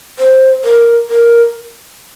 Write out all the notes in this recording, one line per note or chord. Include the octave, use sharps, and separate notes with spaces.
C5
A#4
A#4